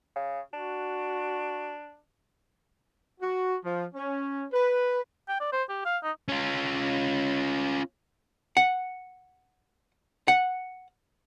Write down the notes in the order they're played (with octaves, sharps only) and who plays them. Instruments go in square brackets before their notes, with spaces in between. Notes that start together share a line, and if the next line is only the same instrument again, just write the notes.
[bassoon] C#3
[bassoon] D4 [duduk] F#4
[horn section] F#4
F3
C#4
B4
[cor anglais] G5
D5
C5
G4
F5
D#4
[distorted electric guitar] C#4 F4
[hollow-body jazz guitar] F#5
F#5